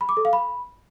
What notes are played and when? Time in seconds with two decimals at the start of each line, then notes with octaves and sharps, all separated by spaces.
0.01 B5
0.09 D6
0.17 A4
0.25 F5
0.33 B5